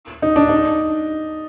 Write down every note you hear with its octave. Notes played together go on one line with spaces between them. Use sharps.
D#4
D4
D#4